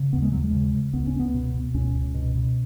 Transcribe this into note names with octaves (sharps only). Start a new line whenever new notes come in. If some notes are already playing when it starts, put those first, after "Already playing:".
Already playing: C#3
D#2 B3
G#3
D#2 F#3
G#3
C#3
C#3
C#2 B3
C#4
C#2
B3
B2
B2
C#2 C#4
C#2
B2
B2